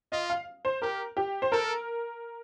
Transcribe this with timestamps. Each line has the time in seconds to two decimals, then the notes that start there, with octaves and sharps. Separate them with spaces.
0.12 F4 D#5
0.30 F5
0.65 C5
0.82 G4 A#4
1.17 G4
1.42 C5
1.52 A4 A#4